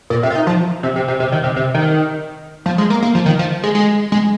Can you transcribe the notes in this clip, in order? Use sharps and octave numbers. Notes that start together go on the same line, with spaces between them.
A#2
C3
F4
D#4
F3
C3
C3
C3
C3
D#3
C3
C3
D#3
F3
G#3
A#3
A#3
F3
D#3
F3
G#3
G#3
G#3